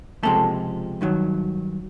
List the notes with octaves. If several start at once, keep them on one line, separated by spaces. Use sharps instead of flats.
C#2 C3 F3 G#3 A3 A4
G2 D#3 F#3